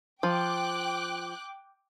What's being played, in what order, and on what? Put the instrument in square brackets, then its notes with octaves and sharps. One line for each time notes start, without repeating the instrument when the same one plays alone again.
[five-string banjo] F3 [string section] G5 D6 F#6